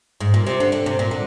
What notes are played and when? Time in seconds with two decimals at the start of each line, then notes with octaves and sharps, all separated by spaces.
0.21 G#2
0.34 A#2
0.46 C3
0.60 D3
0.72 D3
0.86 C3
0.99 A#2
1.11 D3